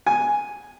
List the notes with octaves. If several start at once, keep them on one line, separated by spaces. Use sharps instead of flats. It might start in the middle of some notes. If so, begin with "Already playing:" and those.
G#5